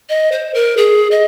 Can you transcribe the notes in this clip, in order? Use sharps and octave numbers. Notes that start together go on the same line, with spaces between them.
D#5
C5
A#4
G#4
D#5